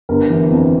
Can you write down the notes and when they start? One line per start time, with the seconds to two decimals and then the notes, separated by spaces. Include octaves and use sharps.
0.09 G1 A#4
0.30 E3
0.51 F2